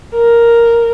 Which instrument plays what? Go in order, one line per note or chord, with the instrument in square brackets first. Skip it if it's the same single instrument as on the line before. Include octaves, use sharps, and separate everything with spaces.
[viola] A#4